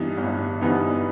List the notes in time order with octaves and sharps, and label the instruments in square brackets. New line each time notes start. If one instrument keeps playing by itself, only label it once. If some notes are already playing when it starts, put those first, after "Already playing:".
Already playing: [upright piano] G2 E3 B3 D#4
G1
G2 E3 B3 D#4